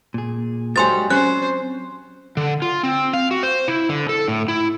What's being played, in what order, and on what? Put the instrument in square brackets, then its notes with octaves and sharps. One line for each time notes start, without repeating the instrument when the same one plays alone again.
[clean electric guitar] A#2 G#4
[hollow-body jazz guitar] G#2 F#3 G3 [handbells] G#5 C6 A6
[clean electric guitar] F#3 C4 [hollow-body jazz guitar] C#4 [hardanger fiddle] C5 [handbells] F#6
[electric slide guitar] D3
F4
C4
F5
F#4
C5
E4
D3
A4
A2
E4